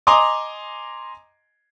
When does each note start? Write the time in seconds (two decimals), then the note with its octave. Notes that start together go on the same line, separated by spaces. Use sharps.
0.07 D#5 G#5 A#5 C6 D6 D#6